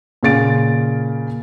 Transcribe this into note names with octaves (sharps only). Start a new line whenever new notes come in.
A#2 C#3 A6 D7